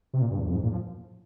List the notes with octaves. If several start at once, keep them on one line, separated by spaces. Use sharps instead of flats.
C3
A#2
G2
E2
F2
G#2
A#2
F3